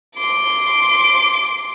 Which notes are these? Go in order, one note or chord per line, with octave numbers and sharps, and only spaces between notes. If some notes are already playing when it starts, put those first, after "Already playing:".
C6 D6